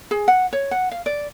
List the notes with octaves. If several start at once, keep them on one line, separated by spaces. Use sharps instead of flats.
G#4
F#5
C#5
F#5
F5
D5